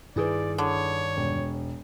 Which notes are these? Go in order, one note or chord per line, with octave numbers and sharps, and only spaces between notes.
G2 D#3 E4 G#4 B4 D5
D3 C#5
E1